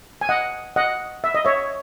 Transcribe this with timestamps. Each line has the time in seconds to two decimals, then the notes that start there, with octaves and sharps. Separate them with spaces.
0.21 G#5
0.29 D#5 F#5
0.76 D#5 F#5
1.24 E5
1.35 D#5
1.45 C#5 E5